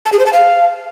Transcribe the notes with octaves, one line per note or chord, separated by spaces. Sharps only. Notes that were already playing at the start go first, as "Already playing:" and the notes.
A5
G#4
C5
A5
F5